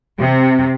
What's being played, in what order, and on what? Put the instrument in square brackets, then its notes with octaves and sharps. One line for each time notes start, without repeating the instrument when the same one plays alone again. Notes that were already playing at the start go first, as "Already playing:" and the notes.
[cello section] C3